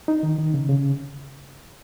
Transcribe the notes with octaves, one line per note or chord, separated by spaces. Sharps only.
D#4
D#3
D#3
C#3
C#3